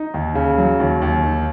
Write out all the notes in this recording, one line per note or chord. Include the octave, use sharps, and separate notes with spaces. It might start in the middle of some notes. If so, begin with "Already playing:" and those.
Already playing: D#4
D#2
C#3
F#3
D#2
D#2
D#3